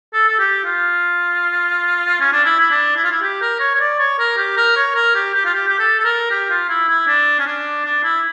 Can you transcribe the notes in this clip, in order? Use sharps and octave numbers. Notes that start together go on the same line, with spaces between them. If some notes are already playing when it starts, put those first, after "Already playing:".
A4
A4
G4
F4
C#4
D4
E4
E4
D4
E4
F4
E4
G4
A#4
C#5
C#5
D5
C#5
A#4
G4
A#4
C#5
A#4
G4
G4
F4
G4
G4
A4
A4
A#4
G4
F4
E4
E4
D4
C#4
D4
D4
E4